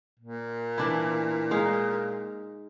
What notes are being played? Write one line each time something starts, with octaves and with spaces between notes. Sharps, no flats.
A#2
E3 D4 E4
G#3 D#4 F5